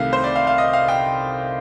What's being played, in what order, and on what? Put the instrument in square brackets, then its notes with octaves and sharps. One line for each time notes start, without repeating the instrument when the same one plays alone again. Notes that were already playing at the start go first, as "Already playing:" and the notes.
Already playing: [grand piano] C2 C3 D#3 A3 F5
C5
D5
F5
F5
D#5
F5
G5